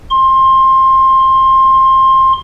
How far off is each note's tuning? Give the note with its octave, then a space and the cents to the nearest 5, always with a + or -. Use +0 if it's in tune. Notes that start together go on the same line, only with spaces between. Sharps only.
C6 +20